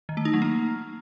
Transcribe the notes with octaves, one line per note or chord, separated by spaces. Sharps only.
D#3
A3
D#4
F#3
A#3